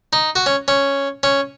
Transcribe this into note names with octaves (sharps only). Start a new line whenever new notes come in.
D#4
F#4
C#4
C#4
C#4